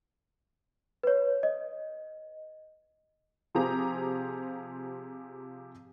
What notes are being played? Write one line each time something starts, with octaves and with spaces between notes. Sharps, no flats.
B4 C#5
D#5
C3 F3 G4 G#4 C5 A#5